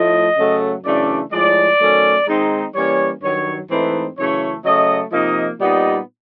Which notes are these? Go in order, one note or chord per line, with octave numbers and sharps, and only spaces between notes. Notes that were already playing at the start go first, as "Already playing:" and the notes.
Already playing: A2 F3 A3 D#5
C#3 F#3 A3
F#2 C#3 E3 A3 D4 D5
A2 F3 G#3 D5
D#3 F#3 A3 C#4
D#3 G#3 C4 D#4
E3 G3 A#3 C#4 C#5
G2 D#3 F#3 C#5
G#2 E3 A3 C4 D#4 B4
F#2 C#3 E3 A3 C#5
C#3 F#3 A3 D#5
C3 F3 A#3 D#4 D#5
A#2 G3 B3 D#4 D#5